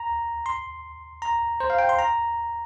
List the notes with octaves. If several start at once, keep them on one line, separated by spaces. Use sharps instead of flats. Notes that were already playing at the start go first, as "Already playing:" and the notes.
Already playing: A#5
C6
A#5
C5
F5
G5
C6
A#5